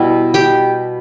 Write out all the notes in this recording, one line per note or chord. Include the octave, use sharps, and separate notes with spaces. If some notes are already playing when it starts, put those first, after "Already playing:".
Already playing: B2 G3 E4
G4 G5